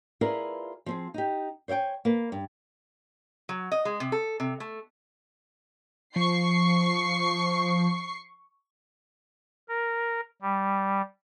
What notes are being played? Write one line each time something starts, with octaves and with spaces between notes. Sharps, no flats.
E4 F4 G#4 A#4 B4 D5
F3 C4 G#4
D#4 G4
C5 C#5 E5 G5 G#5
A#3 B4
G2
F#3
D#5
G#3
C3
A4
C3
A3
F3 C#6 C7
A#4
G3